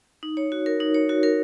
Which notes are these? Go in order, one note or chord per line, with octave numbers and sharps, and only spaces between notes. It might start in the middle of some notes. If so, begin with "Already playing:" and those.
D#4
C#5
F#4
A#4
D#4
C#5
F#4
A#4